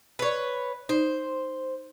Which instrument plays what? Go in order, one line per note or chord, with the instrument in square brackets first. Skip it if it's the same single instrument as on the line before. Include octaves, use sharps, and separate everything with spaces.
[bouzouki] B4 C#5
[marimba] D#4 [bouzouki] C5